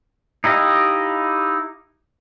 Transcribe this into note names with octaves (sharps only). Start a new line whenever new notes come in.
D#4 E4 G4 D#5 F5